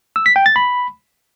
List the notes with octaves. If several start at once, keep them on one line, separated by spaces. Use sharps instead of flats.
E6
B6
G5
A6
B5